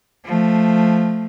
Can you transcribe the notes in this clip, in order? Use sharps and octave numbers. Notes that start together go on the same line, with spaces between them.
F3 A3